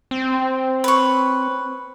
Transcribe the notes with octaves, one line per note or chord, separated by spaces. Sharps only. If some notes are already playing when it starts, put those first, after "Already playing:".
C4
B4 C#5